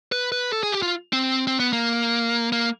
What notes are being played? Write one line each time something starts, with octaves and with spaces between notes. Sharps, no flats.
B4
B4
A4
G#4
G4
F4
C4
C4
B3
A#3
A#3